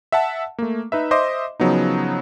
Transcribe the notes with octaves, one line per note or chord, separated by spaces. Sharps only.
E5 F#5 A5
A3 A#3
D#4 B4 E5
C5 D#5 E5 C6 D6
C#3 F3 F#3 B3 D#4